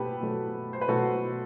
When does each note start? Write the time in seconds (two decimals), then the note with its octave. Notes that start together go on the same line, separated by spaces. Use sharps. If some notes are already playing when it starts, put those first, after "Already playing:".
Already playing: B2 G4 A4 B4
0.21 B2 F#3 A3
0.73 C5
0.81 B4
0.88 B2 F#3 A3 F#4 A4